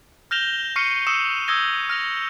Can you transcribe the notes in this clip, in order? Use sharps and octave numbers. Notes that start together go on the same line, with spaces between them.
F6 G6 A#6 E7 F7 G7
C#6 F6 C7 C#7 D#7
C#6 D#6 E6 C#7 E7
D#6 E6 G6 G#6 A#6 G7
F6 A#6 F7